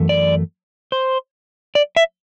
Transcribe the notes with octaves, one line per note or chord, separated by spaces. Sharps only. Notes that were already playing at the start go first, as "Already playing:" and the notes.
Already playing: F#2 E3 A3
D5
C5
D5
E5